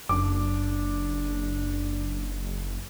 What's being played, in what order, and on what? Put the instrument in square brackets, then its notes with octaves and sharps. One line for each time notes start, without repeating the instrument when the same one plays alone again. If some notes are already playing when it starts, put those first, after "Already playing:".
[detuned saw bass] F#1 [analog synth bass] F#2 [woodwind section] D4 [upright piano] D6